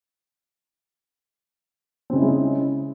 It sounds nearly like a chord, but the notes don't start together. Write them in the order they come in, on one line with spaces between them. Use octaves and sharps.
C4 C#3 D#4 E4 G#3